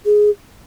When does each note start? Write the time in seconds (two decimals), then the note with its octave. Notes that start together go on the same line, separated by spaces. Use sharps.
0.05 G#4